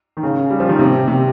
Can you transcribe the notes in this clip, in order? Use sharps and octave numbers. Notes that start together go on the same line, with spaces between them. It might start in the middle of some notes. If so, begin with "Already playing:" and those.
D#3
C#3
G3
F3
D#3
C3
C3